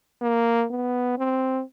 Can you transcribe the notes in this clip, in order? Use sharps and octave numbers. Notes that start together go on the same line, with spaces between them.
A#3
B3
C4